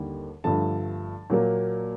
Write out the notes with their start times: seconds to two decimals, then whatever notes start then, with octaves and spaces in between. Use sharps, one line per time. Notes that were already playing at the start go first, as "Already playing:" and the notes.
Already playing: D#2 D3 G3 A#3
0.44 G2 D3 F3 A3 A5
1.30 A#2 F#3 A#3